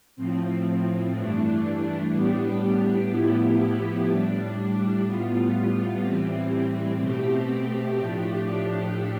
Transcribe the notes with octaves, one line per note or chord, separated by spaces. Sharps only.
A2 F3 C4
G2 E3 A3 D4
A2 G3 B3 D4 G4
A2 F3 B3 E4 G4
A2 G3 D4
A2 G3 B3 F4
A2 E3 G3 C4
B2 A3 C4 G4
A2 F3 A3 D4 G4